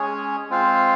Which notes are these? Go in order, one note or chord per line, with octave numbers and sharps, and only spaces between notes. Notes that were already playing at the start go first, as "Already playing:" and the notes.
Already playing: G#3 C#4 G#4 C#5
G#3 C4 F4 C5 F5